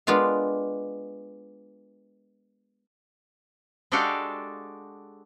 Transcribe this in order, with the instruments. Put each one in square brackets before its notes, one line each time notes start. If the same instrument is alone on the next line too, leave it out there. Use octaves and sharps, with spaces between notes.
[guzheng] G#3 B3 D4 F4 A#4 F5
[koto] G#3 D4 F#4 G4 A4 F5